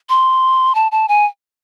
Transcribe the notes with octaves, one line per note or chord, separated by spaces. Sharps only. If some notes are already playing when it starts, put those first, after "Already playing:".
C6
A5
A5
G#5